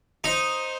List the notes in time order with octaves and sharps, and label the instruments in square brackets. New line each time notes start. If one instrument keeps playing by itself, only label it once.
[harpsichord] D#4 [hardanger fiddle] C5